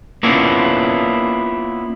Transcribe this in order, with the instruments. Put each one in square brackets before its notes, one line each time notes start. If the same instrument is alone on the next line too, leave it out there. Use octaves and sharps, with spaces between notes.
[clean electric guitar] A#3 B3 C#4 D4 E4 F4